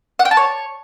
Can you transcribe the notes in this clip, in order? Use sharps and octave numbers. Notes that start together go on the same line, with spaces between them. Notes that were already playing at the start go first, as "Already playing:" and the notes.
F#5
G5
A5
C#5